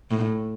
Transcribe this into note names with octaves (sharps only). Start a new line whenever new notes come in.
A2